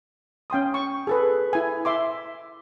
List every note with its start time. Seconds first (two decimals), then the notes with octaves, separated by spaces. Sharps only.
0.50 C#4 G5 C6 D#6
0.74 C#6
1.07 G#4 A4 B4
1.53 E4 G#5
1.85 E5 C6 D6